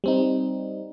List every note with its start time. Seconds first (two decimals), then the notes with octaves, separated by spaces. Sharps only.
0.04 G3 C4 D#4